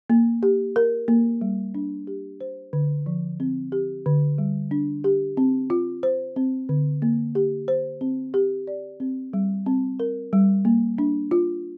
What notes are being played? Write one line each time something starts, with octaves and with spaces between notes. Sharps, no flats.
A#3
G4
A#4
A#3
G3
D4
G4
C5
D3
F3
C4
G4
D3
G3
D4
G4
C4
F4
C5
C4
D3
A#3
G4
C5
C4
G4
D5
C4
G3
C4
A#4
G3
A#3
D4
F4